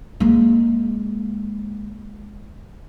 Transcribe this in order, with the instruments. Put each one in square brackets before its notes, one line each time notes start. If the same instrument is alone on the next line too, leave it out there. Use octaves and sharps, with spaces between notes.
[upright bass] G#3 A#3